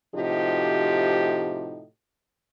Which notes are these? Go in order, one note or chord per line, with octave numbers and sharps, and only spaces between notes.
A2 C3 F3 D#4 F#4 G4